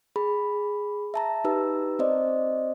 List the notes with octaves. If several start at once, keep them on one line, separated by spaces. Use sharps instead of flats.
G#4 B5
E5 A5 A#5
D#4 G4 B4 A#5 E6
C4 C5 D5 D#5